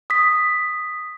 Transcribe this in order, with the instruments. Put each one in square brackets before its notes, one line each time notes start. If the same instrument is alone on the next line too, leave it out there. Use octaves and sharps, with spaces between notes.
[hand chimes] D#6 B6